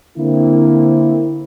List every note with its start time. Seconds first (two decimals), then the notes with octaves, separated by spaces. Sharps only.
0.17 D3 A#3 C4 E4